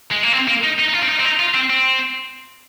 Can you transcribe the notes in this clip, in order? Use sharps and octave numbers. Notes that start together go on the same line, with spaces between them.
G#3
A#3
C4
A#3
D#4
D#4
D#4
F4
C4
D#4
C4
D#4
F4
C4
C4